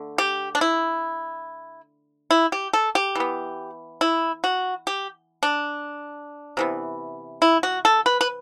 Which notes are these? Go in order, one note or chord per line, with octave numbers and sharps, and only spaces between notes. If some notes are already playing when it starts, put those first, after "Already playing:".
Already playing: D3 A3
G4
D4
E4
E4
G4
A4
G4
E3 B3
E4
F#4
G4
D4
C3 E3 B3
E4
F#4
A4
B4
B4